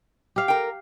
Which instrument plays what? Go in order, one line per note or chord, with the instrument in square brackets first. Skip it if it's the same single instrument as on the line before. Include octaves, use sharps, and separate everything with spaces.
[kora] G4 F5
[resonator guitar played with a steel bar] A#4 G5